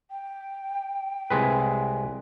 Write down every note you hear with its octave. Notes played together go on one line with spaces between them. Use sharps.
G5
C2 G#3 B4